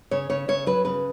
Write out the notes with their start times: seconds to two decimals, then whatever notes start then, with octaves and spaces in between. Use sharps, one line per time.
0.11 C#3 C#5
0.30 C#3 C#5
0.48 C#3 C#5
0.66 F#3 B4
0.85 C#3 B4